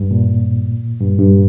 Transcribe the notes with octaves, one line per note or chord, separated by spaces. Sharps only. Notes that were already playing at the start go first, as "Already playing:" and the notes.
Already playing: G2
A#2
G2
G2